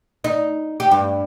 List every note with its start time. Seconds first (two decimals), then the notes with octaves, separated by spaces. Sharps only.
0.24 D#4
0.80 G4
0.91 G2